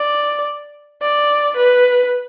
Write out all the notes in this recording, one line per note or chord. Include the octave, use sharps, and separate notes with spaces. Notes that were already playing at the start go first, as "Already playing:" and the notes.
Already playing: D5
D5
B4